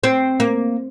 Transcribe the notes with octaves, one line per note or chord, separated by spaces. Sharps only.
C4
A#3